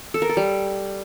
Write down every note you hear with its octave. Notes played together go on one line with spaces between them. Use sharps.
A4
A#4
A4
G3